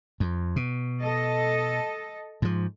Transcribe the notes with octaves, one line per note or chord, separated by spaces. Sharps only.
F2
B2
A4 D#5
G#2 F3